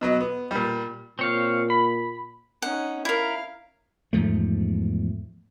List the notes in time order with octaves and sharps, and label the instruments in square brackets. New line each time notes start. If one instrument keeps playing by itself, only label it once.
[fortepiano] B2 F#3 D#5
B3
A#2 G3
[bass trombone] A#2 [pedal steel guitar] C4 C#5 F5
[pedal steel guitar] B5
[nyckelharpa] C#4 D#4 [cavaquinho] F#5
[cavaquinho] E4 A#4 [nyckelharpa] F5
[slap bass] E2 G#2 F3 A3